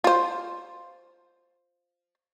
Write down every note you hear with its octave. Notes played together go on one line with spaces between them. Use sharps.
F4 C5